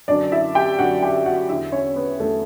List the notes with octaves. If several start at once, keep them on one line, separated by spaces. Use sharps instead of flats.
F#2 D3 D4 D5
E4 E5
G4 G5
F#2 D3 F#4 F#5
G4 G5
F#4 F#5
E2 D3 E4 E5
C#4 C#5
B3 B4
E2 D3 A3 A4